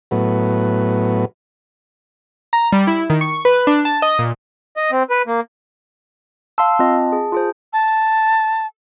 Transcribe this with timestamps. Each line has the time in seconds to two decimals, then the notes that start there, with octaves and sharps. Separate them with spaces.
0.11 A2 F#3 B3
2.53 A#5
2.72 G3
2.87 E4
3.10 D#3
3.21 C#6
3.45 B4
3.67 D4
3.85 A5
4.02 D#5
4.19 A#2
4.77 D#5
4.92 C4
5.10 B4
5.27 A#3
6.58 F5 A5 C6 E6
6.79 C4 F4 D#5
7.12 G#4
7.32 F4 G#4 C5
7.73 A5